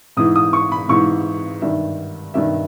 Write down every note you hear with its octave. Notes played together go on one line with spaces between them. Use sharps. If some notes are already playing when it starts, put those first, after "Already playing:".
G#2 E3 D#6
D#6
C#6
B5
G#2 E3 C#6
G2 D#3 E5
G2 D#3 E5